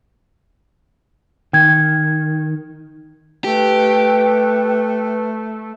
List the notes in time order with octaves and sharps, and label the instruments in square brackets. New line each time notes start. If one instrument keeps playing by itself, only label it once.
[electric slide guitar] D#3 [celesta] G5 G#6
[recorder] A3 [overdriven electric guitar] G4 [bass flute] B4